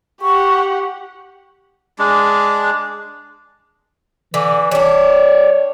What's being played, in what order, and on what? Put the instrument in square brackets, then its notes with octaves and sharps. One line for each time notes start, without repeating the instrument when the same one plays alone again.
[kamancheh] G4 F#5 [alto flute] C#6
[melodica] G#3 D4
[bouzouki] D3 [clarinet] E3
[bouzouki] G3 D4 [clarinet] C#5